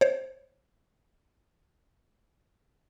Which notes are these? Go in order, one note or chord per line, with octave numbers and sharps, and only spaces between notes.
C5 C#5